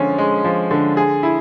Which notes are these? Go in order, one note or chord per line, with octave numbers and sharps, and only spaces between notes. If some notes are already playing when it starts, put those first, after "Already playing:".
Already playing: D3 F3 G#3 C#4
G#3
F3
D3
G#4
E4